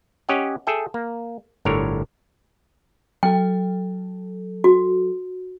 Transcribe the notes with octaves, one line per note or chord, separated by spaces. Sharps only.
C#4 G4 C#5 D#5 F#5
G#4 A4 E5 G5
A#3
G1 A2 D3 A#4 C#5
F#3 A4 G5
F#4